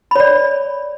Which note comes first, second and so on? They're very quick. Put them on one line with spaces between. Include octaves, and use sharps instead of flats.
B5 C#5 D5